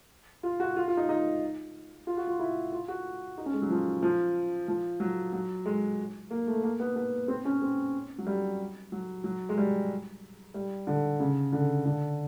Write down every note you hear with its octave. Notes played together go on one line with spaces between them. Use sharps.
F4
F#4
F4
F4
D#4
D#4
F4
F#4
F4
E4
F4
F#4
D#4
C#4
G#3
F#3
F3
F3
F3
F#3
F#3
G#3
A#3
A3
A#3
B3
B3
C4
C#4
C4
F#3
G3
F#3
F#3
G#3
G3
G3
D3
C#3
D3
D3